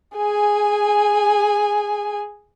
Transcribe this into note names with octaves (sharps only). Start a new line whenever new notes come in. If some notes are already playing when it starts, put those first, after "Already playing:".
G#4 G#5